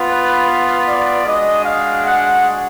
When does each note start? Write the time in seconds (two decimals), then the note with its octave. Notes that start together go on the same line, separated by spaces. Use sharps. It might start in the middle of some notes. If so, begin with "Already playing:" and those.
Already playing: B3 F4
0.10 B4
0.87 D5
1.26 G#3 D4 F#4 D#5
1.65 F5
2.04 F#5